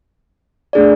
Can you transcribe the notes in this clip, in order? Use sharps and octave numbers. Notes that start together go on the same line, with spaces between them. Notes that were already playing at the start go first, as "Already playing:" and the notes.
A3 D4 G#4 D5